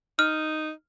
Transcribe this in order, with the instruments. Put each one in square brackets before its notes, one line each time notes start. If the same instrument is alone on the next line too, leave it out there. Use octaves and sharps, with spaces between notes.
[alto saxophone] D#4 [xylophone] F6